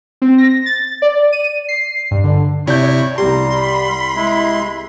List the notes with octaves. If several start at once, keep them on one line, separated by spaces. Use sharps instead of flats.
C4
A#6
A6
D5
D#7
C7
G2
D3
C3 E4 C#5 D5 G6
C2 G3 G4 A#5 C6
B5
G#3 E4